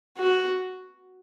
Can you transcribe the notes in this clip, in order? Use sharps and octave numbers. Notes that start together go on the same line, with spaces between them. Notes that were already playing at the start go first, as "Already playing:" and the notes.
F#4